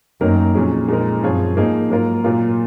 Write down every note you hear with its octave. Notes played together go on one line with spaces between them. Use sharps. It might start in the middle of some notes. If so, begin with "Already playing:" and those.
F#2 D#3 F#3 A#3 D#4 A#4
F2 A#2 F#3 C#4 G#4
A#2 G#3 D#4 A#4
F#2 F3 C4 F4 G#4 C#5
G#2 F3 A#3 D#4 G#4
G#2 F#3 A#3 F4 A#4
A#2 F#3 A#3 F4